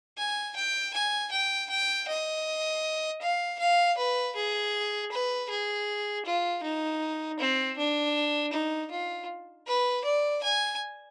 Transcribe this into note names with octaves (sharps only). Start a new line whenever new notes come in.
G#5
G5
G#5
G5
G5
D#5
F5
F5
B4
G#4
B4
G#4
F4
D#4
C4
D4
D#4
F4
B4
D5
G#5